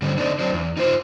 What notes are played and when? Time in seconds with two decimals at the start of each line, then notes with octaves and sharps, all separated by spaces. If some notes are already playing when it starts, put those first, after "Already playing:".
0.02 D3 G3 C4 C#4
0.18 D3 C4 D4 D#4
0.39 F#3 C4 D4
0.53 E2
0.77 D#4 F4 C5